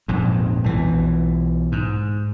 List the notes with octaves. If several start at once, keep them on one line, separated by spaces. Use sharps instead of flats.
A#1 F2 G#2
B1 E3
G#2